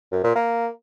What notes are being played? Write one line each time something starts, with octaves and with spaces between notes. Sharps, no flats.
F#2
A#2
A#3